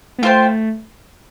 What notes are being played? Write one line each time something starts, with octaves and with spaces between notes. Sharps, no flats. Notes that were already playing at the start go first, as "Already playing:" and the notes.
B3
A3 F4 C5 G5